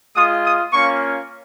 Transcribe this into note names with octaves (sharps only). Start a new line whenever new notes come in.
G#3 F4 D#6
D#6
A#3 C#4 F4 C#6